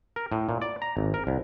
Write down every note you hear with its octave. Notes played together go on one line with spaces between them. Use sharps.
A#4
A2
A#2
D5
A#5
G#1
A#4
C2